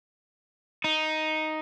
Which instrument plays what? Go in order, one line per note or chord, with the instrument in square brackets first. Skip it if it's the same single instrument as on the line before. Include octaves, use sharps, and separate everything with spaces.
[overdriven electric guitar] D#4